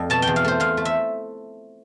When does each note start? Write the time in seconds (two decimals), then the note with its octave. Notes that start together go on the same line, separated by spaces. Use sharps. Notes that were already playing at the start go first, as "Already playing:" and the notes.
Already playing: F2 A3 D5
0.10 B2 A5
0.22 G5
0.27 E2
0.36 F5
0.45 A3 C5
0.60 E2 F5
0.77 A3
0.85 E5